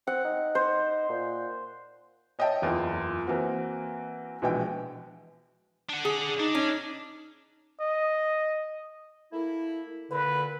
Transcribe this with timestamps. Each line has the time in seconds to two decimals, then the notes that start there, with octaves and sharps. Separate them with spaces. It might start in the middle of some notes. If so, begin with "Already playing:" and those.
0.07 C4 F#5
0.25 D#4
0.55 C5
1.10 A#2
2.39 C#5 D#5 E5 G5 A5
2.62 F#1 E2 F4
3.27 E3 A#3 C4 F#4
4.42 A#1 B2 E3 G#3 G5
5.90 D4 F#5
6.05 G#4
6.40 D4 D#4
6.55 C#4
7.80 D#5
9.32 A3 A#3 E4
10.11 A#2 D3 B4